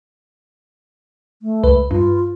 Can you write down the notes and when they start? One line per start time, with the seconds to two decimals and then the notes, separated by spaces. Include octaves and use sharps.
1.42 A3
1.64 C#2 B4
1.91 G2 F4